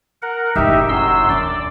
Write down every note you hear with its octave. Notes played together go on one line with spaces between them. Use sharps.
A#4 F#5
F#1 A2 D#4 G4 E5
F#2 C6 E6
D#1 D4 D5